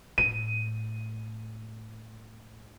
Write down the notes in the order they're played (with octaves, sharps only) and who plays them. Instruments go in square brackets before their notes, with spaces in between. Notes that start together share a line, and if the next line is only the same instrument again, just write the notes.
[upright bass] A2 [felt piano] D#7